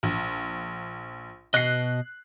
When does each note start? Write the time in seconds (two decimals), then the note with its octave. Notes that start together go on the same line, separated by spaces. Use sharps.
0.03 A#1
1.54 B2 D#5 F#6 C7